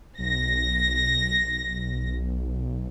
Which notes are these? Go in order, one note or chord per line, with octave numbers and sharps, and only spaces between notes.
B1 A#6